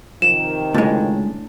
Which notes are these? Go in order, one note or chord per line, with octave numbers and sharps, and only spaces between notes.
C3 D#3 F3 E7
C#2 A2 G#3 D4 A5